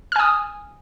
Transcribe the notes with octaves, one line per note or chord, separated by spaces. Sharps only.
G#5 D#6 F6